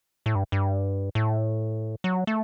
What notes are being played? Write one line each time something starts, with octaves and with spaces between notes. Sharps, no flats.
A2
G2
G2
A2
F#3
A3